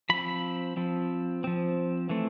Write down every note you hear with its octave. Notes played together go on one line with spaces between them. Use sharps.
F3 C4 B5
F3 C4
F3 C4
E3 A3 C4